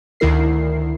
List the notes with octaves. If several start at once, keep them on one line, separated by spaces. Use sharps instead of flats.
D2 D#3 E4 A#4 C7